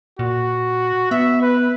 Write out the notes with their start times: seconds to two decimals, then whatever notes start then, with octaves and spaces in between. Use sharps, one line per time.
0.19 A#2 F#4
1.11 B3 E5
1.42 B4